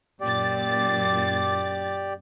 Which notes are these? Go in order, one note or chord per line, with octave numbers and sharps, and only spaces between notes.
F#2 A#2 G4 D5 A6